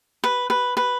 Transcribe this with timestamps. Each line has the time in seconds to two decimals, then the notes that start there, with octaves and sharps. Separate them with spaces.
0.24 B4
0.50 B4
0.77 B4